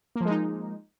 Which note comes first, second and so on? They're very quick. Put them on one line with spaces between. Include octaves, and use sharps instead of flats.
A#3 F3 G#3 D#4